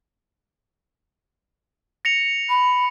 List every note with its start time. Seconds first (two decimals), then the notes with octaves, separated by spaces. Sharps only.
2.05 A#6 C#7 F7
2.49 B5